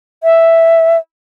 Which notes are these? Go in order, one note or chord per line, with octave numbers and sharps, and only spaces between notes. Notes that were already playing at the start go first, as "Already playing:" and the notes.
E5